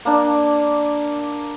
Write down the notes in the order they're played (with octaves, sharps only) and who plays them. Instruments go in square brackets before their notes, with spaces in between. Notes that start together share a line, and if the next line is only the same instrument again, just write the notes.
[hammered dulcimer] A#3 D4